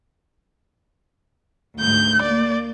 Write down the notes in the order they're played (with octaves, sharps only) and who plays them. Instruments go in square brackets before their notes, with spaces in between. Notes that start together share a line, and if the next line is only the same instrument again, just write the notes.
[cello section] D2 G#2 [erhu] G6
[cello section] A#3 [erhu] D5